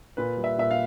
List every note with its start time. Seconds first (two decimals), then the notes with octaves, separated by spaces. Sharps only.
0.17 A#2 B4
0.37 G3
0.44 E5
0.58 A#2 E5
0.71 F5